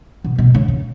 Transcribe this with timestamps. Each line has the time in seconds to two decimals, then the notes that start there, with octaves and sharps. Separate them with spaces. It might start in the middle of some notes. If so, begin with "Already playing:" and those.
0.24 B2
0.38 B2
0.54 C#3
0.68 C#3